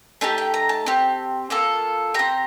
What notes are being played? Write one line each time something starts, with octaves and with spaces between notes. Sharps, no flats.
A3 D#4 G4 A5
G5
A#5
A5
C4 G4
A#3 F4 A4
C4 G4 A#5